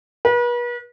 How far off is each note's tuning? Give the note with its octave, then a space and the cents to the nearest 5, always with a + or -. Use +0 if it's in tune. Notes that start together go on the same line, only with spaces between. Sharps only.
B4 -40